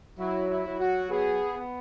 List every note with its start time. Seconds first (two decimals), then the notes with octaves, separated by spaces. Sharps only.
0.19 F#3 E4
0.50 E4
0.65 F#3
0.80 F#4
1.11 B3 G#4
1.57 B3